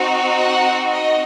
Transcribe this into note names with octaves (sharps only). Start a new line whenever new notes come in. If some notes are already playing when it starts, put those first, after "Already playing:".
Already playing: C4 D#4 F#4
F#5
D#5